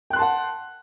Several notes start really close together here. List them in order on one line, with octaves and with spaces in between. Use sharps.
G5 F#6 C6 A5 F#5